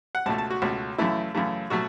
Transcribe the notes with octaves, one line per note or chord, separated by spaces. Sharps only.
F#5
C#2 B2 A3 A5
A5
F#4
C#2 B2 A3
F#2 C#3 E3 A3 E4
F#2 C#3 E3 A3
B2 F#3 A3 F#4